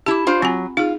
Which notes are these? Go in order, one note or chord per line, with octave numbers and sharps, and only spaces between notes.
E4 G4 A5 D6
D4 F4 C5
F#3 C4 F4 G#5
D#4 F4 G#4